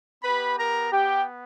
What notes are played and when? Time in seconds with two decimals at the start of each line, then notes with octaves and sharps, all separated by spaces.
0.23 B3 G4 B4 B5
0.59 A#4 A#5
0.93 G4 G5